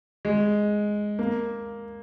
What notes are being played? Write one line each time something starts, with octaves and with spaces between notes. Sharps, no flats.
G#3
A#3